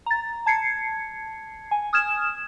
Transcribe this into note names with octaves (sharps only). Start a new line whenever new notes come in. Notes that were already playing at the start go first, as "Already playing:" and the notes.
A#5 A6
A5 G#6 C7 C#7
G#5
D#6 F6 G#6 E7